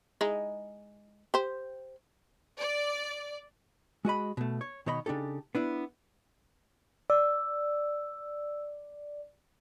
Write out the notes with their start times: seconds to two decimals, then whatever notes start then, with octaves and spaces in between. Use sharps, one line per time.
0.21 G#3 D#4 E4
1.34 G4 C5
2.59 D5
4.05 G#3 F#4 D#5 B5
4.37 B2 A3
4.61 C#5
4.86 B2 D#3 C#5 D#5 B5
5.06 C#3 D4 D#4 G4 A4
5.55 B3 D4 E4
7.10 D5 E6